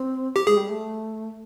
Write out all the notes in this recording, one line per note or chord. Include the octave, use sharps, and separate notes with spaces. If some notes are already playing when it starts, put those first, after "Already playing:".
Already playing: C4
G4
G#3 G#4
G3
A3